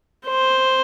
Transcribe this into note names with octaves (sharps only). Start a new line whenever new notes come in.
C5